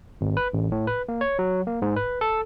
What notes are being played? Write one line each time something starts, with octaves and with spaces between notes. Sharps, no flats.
G#1
B4
A1
A2
B4
A#3
C#5
F#3
A#3
G#2
B4
A4